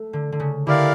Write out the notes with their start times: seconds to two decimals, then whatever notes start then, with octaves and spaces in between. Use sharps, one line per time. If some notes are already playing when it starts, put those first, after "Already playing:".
Already playing: A3
0.13 D3
0.32 D3
0.40 C#3
0.67 D3 E4 G4 A#4 D5 F5